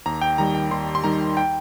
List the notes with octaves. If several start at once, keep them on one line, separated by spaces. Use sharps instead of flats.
D#2 A#5
G5
D#3 G3 A#5
G5
D#2 C6
C6
D#3 G3 A#5
G5